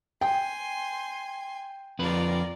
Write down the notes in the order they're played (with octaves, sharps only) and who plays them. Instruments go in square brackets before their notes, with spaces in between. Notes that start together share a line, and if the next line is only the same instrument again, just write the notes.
[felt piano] G5 [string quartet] G#5 C6
[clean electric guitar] F2 B4 B5 [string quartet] F4 A#4 D5